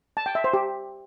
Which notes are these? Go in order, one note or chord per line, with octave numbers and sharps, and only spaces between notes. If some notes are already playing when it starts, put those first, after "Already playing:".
A5
G5
E5
C5
G4